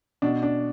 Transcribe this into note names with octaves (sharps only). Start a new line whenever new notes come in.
B2 D4
D4